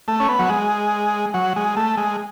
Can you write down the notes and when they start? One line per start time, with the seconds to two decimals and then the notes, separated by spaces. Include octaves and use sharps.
0.08 A3
0.20 C#4
0.29 B3
0.39 F#3
0.49 G#3
1.34 F#3
1.56 G#3
1.77 A3
1.97 G#3